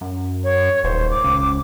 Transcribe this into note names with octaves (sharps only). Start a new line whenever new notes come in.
F#2
C#5
D#1 C5
D6
C#2